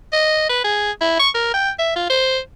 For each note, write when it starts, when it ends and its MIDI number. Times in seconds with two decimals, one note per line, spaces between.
0.13 0.48 75
0.49 0.62 71
0.64 0.91 68
1.01 1.15 64
1.19 1.29 85
1.35 1.51 70
1.54 1.70 79
1.79 1.92 76
1.96 2.08 65
2.10 2.38 72